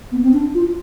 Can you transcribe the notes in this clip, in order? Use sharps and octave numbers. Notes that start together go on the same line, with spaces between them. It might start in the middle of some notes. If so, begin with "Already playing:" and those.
B3
C4
D4
F4